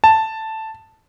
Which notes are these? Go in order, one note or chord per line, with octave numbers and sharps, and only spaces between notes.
A5